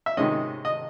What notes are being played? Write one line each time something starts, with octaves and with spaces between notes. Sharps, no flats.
E5
C3 D#3 G#3 C#4 D#5
D#5